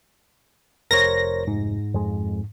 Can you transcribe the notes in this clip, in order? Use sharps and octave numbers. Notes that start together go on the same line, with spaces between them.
F1 A#4 C5 C#5 A#6
G#2
F2 G#3